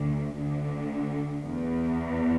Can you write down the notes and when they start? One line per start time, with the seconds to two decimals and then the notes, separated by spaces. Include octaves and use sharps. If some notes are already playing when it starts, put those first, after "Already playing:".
Already playing: D2 D3
0.37 D2 D3
1.44 E2